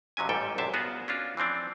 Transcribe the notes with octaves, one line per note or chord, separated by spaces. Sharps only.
F2 C3 F#3 C#4 G#5
A1 G#2 G3 A4 G5
A#1 F#2 C3 C5 E5 A5
B3 F4 F#4 G#4
C#4 D4 F4 F#4 G#4
E3 F3 C4 D4